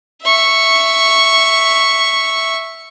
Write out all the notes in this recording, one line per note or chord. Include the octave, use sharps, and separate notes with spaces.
E5 C#6